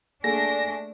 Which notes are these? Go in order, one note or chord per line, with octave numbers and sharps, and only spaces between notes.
A3 A#3 D4 G#4 A4 G#5 A#6